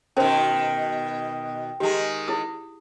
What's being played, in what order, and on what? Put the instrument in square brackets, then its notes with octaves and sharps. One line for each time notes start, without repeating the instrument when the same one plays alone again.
[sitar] B2 D#3 [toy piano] C#4 A#4 C5 [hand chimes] G5
[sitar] D#3 G#3 [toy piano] G4 A#5
[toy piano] E4 G#4 D#6